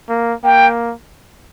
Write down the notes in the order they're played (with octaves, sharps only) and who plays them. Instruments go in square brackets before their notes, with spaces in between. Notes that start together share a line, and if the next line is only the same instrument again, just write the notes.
[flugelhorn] A#3
[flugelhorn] A#3 [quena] G5